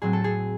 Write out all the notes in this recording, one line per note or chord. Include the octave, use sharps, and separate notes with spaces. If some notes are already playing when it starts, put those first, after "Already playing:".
A2 F#3 C4 G#4
A4
G#4